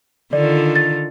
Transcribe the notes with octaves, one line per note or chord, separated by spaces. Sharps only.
D3 D#3 F4 D5
A6